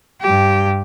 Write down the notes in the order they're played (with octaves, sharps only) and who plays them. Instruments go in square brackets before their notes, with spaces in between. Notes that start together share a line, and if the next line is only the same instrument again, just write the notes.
[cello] G2 G4